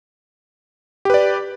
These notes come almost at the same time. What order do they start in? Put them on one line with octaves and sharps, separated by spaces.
G4 B4 D5